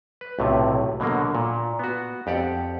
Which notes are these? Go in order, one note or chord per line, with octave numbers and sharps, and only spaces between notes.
B4
B1 A2 C3
B2 D3 F#3 A#3
A#2
B3 F#4
F2 G4 D5 F#5